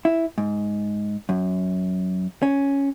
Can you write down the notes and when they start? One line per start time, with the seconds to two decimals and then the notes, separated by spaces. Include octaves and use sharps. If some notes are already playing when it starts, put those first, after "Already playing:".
0.05 E4
0.38 G#2
1.29 F#2
2.43 C#4